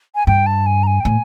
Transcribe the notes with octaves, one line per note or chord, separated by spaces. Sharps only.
G#5
G2 G5
A5
G#5
A#5
G#5
G5
A2 G#5